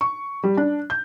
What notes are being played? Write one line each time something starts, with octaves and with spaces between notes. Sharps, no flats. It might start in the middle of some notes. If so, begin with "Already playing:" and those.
C#6
G3
D4
G6